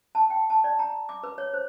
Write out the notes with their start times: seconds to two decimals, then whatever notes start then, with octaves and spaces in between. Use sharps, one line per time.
0.15 A5
0.30 G5
0.50 A5
0.64 D5
0.79 A#5
1.09 D6
1.23 B4
1.38 C#5
1.54 C5